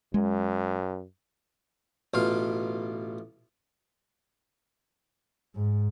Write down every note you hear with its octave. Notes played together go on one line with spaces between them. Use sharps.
F#2 G#3
A1 B2 F4 F5
G#2